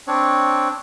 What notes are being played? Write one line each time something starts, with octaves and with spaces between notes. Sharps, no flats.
C4 D4 C#5